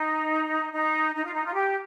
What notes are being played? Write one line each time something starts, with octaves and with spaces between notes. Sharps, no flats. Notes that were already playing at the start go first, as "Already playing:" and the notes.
Already playing: D#4
D#4
D#4
F4
D#4
F4
G4